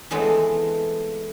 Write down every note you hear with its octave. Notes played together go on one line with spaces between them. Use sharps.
E3 G#3 A3 B3 C4